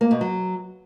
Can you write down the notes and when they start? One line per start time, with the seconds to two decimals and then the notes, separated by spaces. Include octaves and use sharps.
0.01 A#3
0.11 B2
0.21 F#3